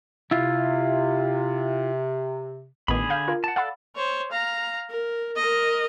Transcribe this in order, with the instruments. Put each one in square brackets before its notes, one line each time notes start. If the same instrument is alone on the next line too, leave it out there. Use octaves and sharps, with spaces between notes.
[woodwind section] C3 [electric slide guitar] E4 F4
[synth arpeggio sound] A1 D#3 B3 [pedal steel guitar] D3 G#4 B5
[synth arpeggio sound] F5 G6
F4 A#4
[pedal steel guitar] F#5 A5
[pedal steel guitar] A4 D5 [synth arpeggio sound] F5 F#5 B5
[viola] C5 C#5
F5 A#5
A#4
A#4 D#5